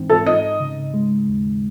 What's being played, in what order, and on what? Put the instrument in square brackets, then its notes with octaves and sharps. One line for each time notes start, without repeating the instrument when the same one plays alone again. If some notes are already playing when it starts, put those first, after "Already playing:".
Already playing: [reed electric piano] G#2 E3 C4 D#4
[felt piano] A4
[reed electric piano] D#4 [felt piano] D#5
[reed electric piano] C#3
G#3
D#2